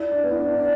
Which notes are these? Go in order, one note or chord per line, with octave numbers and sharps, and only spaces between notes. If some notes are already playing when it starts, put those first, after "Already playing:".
Already playing: E4 D5
D4
B3
E4
D4
D4